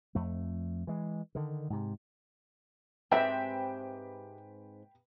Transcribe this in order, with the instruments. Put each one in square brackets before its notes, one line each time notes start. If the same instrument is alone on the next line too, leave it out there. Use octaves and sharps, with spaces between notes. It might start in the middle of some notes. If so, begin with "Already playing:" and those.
[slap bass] F2 A3
E3 G#3
D3 D#3
G#2 C3
[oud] G#2 C4 [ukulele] G4 E5 [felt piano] B4 G5